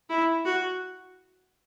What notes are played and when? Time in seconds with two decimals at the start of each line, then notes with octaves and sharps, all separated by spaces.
0.09 E4
0.45 F#4